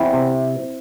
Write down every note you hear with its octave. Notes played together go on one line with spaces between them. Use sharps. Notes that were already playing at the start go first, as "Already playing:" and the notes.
Already playing: E2 C4 E4
C3